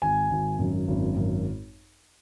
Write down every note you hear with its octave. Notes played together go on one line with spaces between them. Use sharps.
G#1 G#5
G#1
F#2
G#1
F#2